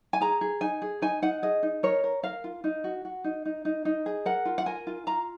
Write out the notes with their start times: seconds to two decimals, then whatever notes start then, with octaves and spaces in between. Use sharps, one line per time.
0.13 G#5
0.21 G#4 A#5
0.41 G#4
0.61 D#4 G#5
0.82 G#4
1.02 D#4 G#5
1.22 D#4 F#5
1.42 G#4 D#5
1.63 D#4
1.83 A#4 C#5
2.04 A#4
2.23 A#4 F5
2.44 F4
2.64 D#4
2.84 F#4
3.05 F#4
3.24 D#4
3.45 D#4
3.65 D#4
3.85 D#4
4.06 G#4
4.26 A#4 F#5
4.45 F4
4.58 F#5
4.66 A#4 G#5
4.87 F4
5.07 F4 A#5